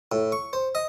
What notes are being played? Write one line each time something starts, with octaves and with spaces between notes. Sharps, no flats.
A2
C#6
C5
D#5